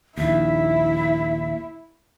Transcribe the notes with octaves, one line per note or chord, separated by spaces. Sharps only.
A#1 D#2 E4 E5